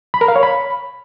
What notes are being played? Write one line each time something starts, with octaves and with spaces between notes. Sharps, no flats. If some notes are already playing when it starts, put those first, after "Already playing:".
B5
A#4
F5
C#5
B5